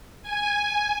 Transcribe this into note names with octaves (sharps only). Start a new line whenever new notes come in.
G#5